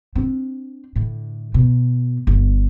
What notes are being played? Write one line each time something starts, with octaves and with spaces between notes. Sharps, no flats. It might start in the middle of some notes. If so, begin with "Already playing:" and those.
C4 D4
A2 D3
B2
G1 D3